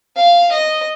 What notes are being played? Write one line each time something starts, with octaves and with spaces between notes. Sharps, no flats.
F5
D#5